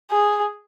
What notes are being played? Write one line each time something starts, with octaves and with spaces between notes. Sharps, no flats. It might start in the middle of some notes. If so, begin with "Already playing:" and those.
G#4